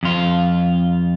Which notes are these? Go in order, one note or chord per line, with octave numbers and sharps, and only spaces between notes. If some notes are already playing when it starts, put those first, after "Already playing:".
F2 F4